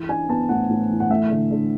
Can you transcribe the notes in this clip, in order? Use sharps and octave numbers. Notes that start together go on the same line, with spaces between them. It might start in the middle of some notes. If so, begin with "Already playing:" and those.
Already playing: E3
D4 G#5
B3 A5
A2 F#5
A2
E3
F#5
A3 E5
D3
D3